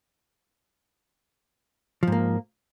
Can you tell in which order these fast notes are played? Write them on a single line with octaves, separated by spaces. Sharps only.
F3 G#2 A#3